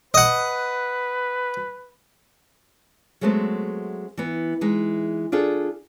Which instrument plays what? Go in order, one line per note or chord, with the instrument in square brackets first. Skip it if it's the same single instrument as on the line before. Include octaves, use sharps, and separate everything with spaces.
[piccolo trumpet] B4 [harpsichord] D#5 F#5
[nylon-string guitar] F#3 G#3 A3 B3 C4
E3 B3
E3 G#3 D#4
D4 F4 G#4 A4